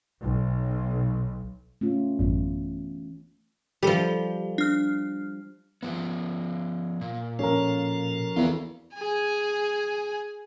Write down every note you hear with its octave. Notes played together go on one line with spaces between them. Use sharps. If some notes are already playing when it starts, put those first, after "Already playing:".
B1
A3 C#4 F4
A1 F#2 E3 B3
F3 G3 G4 A4
D4 F6
F3 B3
A#2
F3 C#4 F#4 A4 A#4
E2 F4 B4
G#4 G#5